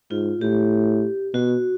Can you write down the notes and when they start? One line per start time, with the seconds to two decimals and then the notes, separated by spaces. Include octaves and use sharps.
0.11 G#2 F4
0.41 A2 G4
1.34 B2 F#4